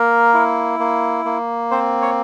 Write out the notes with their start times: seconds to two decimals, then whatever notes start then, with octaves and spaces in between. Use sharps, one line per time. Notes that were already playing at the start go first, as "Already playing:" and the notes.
Already playing: A#3 A#4
0.34 E4
0.79 A#3
1.25 A#3
1.71 C4 C5
2.02 C#5